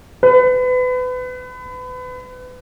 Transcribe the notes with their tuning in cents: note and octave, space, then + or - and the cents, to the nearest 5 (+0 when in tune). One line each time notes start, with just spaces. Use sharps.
B4 +30